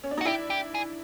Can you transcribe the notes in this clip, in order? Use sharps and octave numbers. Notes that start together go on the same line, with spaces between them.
C#4
D4
D#4
F#4
D4 E4 G4
G4
G#4